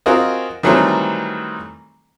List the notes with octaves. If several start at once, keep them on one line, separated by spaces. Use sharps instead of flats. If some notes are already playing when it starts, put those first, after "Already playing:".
C4 F4 F#4 G#4 A#4 D#5
D#3 E3 F#3 G3 A3 C4